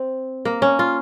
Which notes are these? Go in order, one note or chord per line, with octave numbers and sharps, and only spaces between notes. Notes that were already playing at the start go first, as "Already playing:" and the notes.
Already playing: C4
A#3
C#4
F4